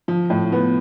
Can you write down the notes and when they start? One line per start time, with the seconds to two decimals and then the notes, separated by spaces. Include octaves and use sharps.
0.08 F3
0.30 A2
0.52 B3